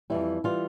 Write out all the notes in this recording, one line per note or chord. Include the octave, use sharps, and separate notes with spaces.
F2 E3 G3 E4
E3 G3 F4